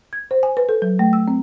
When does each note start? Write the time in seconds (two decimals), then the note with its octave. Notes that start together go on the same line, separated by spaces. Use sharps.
0.13 G#6
0.31 C5
0.43 G#5
0.57 B4
0.69 A4
0.82 F#3
0.99 A3
1.13 E6
1.28 C4